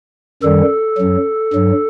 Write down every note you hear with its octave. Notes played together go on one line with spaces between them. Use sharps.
F#2 D#3 G3 A4
F#2 F#3
G2 F#3